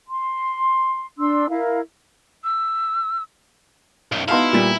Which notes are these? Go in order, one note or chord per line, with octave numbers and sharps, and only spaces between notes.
C6
D4 C6 E6
E4 A#4 F5
E6
B1 F#2
B3 D#4 E4 F#4 F5 A5 C6
A#2 G3